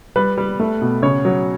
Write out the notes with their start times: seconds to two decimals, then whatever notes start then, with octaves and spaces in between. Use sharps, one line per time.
0.16 G3 B4
0.38 G3
0.60 A3
0.82 B2
1.03 C#3 C#5
1.25 F#3